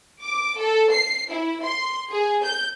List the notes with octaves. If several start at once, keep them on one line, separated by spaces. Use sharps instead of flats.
D6
A4
C7
E4
C6
G#4
G6